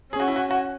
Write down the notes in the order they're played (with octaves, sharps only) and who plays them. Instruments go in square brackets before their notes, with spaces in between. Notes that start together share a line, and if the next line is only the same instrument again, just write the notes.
[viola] C#4 [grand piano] G#4
[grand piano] F#4
E4
F#4
F#4